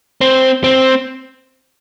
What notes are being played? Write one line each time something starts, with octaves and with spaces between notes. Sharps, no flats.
C4
C4